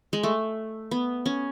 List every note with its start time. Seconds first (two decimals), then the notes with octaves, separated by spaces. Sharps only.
0.13 G#3
0.23 A3
0.91 B3
1.26 C#4